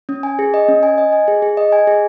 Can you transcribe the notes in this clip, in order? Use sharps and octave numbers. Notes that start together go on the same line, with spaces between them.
C#4
G#5
G#4
D#5
C#4
G#5
D#5
G#5
G#4
G#4
D#5
G#5
G#4